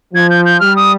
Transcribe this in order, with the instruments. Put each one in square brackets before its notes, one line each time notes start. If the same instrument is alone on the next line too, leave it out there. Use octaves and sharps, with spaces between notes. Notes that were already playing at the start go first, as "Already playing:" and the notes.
[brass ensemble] F3 [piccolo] G#6
[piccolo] G6
G6
[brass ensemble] G3 [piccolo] F6
[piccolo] D#6